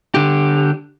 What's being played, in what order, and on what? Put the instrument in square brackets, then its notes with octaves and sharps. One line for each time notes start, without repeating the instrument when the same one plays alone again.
[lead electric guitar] D3 G4